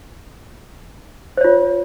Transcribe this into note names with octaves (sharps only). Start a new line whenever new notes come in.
F4 C5 C#5